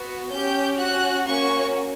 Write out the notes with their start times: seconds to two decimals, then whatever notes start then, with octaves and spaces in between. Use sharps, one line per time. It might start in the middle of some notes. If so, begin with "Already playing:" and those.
Already playing: B3 F#4
0.30 C#4 G4 G6
0.79 C#4 F#4 F#6
1.28 A#3 C#4 F#4 C#6